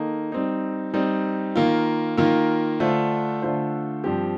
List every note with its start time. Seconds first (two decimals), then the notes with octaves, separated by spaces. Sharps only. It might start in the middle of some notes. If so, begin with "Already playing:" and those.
Already playing: D#3 A#3 D#4 A4
0.32 G3 C4 D#4
0.94 G3 C4 D#4
1.56 D#3 A#3 F4
2.17 D#3 A#3 F4
2.80 D3 A3 D4 F4 C5
3.42 D3 A3 D4 F4 C5
4.04 G2 F3 C4 G4